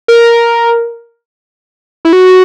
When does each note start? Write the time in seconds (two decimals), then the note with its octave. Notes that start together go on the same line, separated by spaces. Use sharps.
0.08 A#4
2.05 E4
2.13 F#4